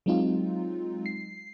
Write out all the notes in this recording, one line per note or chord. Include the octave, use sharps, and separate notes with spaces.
F#3 G#3 C4 D#4 F4
C7